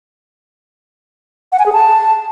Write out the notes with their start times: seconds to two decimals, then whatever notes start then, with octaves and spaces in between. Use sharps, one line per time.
1.52 F#5
1.59 G#5
1.66 G#4
1.73 A5